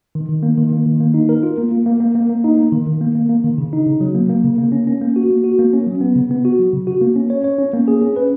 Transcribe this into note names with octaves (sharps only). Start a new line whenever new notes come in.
D#3
D#3
A#3
D#3
A#3
D#3
A#3
D#4
A#4
F4
A#3
A#3
A#3
A#3
A#3
A#3
D#4
A#3
D#3
D#3
A#3
A#3
A#3
D#3
C#3
D#4
C#3
F#3
A#3
A#3
C#3
A#3
C#4
C#4
A#3
F#4
A#3
F#4
A#3
C#4
F#3
B3
C#3
B3
F#4
F#3
C#3
F#4
A#3
C#4
C#5
C#5
C#4
A#3
G#4
C#4
B4